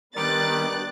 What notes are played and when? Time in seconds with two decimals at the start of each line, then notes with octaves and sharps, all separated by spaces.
0.15 D#3 G3 B3 D4 G4 D5 F#6 A6